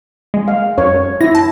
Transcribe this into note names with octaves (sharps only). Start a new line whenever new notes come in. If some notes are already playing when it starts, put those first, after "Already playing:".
G#3
F5
F#2 C#5
E4 A#6
A5